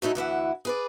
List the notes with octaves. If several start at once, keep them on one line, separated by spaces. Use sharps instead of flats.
F#3 A3 D#4 E4
D2 E3 E4 F#5
G#4 B4 D5